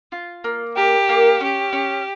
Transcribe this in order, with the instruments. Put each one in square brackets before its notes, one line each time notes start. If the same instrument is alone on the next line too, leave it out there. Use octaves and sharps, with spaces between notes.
[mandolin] F4
A#3
[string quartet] G4 [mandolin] A#4
[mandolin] A#3
[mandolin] C#4 [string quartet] G4
[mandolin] C#4